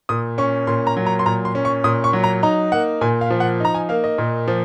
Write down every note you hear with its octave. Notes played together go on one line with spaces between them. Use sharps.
A#2 D#6
C#4 C#6
A#2 C6
A#5
F#3
A#5
C6
A#2 A#5
C6
C#4
C#6
A#2 D#6
C#6
F#3
A#5
D#4 A#5
A#3 F#5
A#2 G#5
F5
F3
F#5
D#4 A#5
G#5
A#3 F5
D#5
A#2
F3